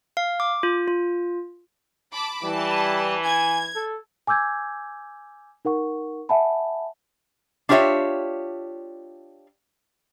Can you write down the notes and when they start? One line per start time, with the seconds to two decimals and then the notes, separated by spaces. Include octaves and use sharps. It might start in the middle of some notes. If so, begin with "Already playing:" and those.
0.17 F5
0.40 D6
0.63 F4
0.88 F4
2.13 A5 B5 D6
2.44 E3 G3 A5
3.24 G#5 G#6
3.76 A4
4.27 G#5 D6 E6 G6 G#6
5.65 D#4 A#4 F#5 C#6
6.29 E5 F#5 G#5 A5 B5
7.69 D4 F4 G4 C#5 E5